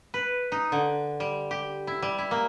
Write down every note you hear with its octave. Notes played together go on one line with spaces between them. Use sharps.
B4
D#4
D3
G3
G4
E4
G3
E4
A#3